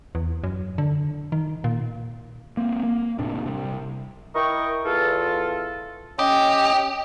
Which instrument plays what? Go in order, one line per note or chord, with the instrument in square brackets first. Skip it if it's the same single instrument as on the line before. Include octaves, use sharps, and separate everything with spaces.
[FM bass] E2
F#2
D3
D#3
A#2
[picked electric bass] A#3 C4
A#3
D#1 A2 C3 D4
C3 G3
[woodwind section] E4 A#4 D#5 G5 C#6
E2 F4 A4
[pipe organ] C#4 D#5 [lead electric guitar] G4